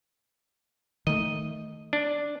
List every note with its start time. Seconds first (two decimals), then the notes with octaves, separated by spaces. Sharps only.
1.07 D#3 A3 D#5
1.93 D4